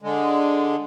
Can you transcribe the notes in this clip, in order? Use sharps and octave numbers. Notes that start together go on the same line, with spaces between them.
D3 G#3